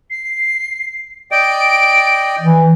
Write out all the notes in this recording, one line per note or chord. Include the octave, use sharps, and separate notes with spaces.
C7
D5 D#5 G5 D7
E3